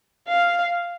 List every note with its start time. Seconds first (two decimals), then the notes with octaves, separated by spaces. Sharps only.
0.28 F5